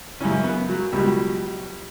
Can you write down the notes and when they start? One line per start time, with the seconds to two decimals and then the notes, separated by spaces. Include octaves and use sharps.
0.20 F#2 C#3 E3 C#4
0.44 B3
0.69 F#3
0.92 C#2 B2 F#3 G3